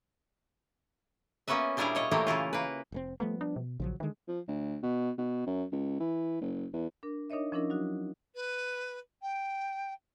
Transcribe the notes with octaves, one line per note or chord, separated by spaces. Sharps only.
A#3 B3 C#4 F#4 B4 E5
A#2 G3 D4 E4 G#4 F5
B2 C#5 D#5
A#2 E3 F#3 A3 A#3 G4
C#3 E3 E4 F4
A#3 B4
F1 A2 C4
F3 G3 A3 B3
D4
B2
A#1 C#3 F3 F#3
D3 D#3 G#3
F3
D2
B2
B2
F#2
C#2
E3
F#1
E2
D4 A#4
D4 D#4 A#4 C#5 D#5 E5
F3 C#4 D4 E4 A#4 D#5
F#3 D#4 F#4
B4
G5